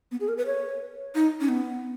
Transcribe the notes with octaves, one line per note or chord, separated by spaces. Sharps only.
B3
G#4
A#4
B4
C#5
D#4
C#4
B3